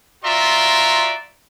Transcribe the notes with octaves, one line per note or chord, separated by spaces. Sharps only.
F4 F#4 D5 E5 A#5 C6